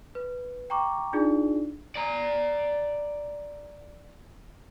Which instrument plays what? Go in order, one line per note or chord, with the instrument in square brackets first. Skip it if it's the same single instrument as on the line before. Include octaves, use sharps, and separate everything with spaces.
[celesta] B4
G5 A#5 C#6 D6
D4 D#4 F4 G#4 D5
[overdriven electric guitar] D5 A#5